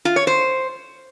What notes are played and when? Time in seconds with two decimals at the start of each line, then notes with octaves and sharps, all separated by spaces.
0.05 F4
0.16 C#5
0.27 C5